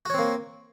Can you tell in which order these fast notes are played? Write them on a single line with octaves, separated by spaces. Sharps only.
F#4 C#5 C4 A#3